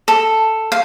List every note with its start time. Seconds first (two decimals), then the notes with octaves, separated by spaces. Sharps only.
0.08 A4
0.72 F5